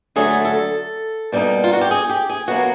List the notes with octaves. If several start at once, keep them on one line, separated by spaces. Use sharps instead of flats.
D3 F#3 A3 G#4
A4
B2 G3 A#3 D#4
F4
F#4
G4
G#4
G4
G#4
B2 F#3 A#3 F#4